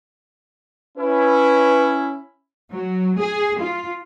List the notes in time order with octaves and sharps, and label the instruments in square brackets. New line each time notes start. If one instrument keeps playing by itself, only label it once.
[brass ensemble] C#4 E4 [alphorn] B4
[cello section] F#3
G#4
F4